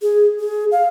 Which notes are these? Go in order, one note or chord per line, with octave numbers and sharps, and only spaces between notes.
G#4
G#4
F5